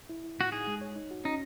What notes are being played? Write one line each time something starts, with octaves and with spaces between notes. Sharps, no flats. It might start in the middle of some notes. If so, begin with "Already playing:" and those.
E4
E4
A2 F#4
D#4 G#4
G#3
C#5
D#4
F#4
C#4 D#4